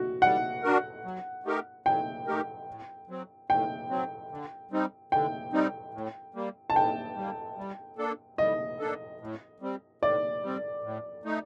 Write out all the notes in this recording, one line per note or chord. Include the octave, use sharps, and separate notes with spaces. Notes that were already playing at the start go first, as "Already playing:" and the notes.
Already playing: F#4
G3 F#5
D4 F#4 A#4
F#3
A3 D#4 G4 A#4
F#3 G5
A3 D#4 G4 A#4
A2
F#3 C4
A2 G5
F#3 C4
D3
G3 C4 D#4
D3 G5
G3 C4 D#4
A2
G3 A#3
A5
A2 G5
G3 A#3
G3
A#3 D4 A4
G3 D#5
A#3 D4 A4
A2
G3 C4
A2 D5
G3 C4
A2
A3 D#4